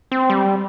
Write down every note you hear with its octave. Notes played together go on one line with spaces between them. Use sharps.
C4
G3